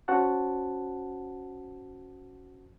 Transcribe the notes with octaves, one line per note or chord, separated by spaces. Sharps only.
C#4 F#4 C5 F#5 A5